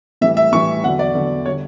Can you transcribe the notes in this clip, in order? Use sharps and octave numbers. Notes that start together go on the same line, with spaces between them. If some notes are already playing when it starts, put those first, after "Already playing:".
A2 E3 G3 E5
E5
A2 E3 G3 C#6
E2 D3 F#3 F#5
D5
E2 D3 F#3
D3 G3 C#5